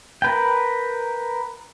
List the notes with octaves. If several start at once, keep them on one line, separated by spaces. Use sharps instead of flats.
A#4 B4 G5